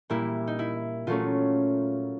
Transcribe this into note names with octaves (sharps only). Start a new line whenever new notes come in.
A#2 G3 A#3 E4
D#4
E4
A#2 F#3 A3 C#4 F4